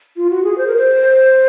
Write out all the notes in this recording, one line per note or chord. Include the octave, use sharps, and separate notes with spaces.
F4
F#4
G#4
C5
A#4
C5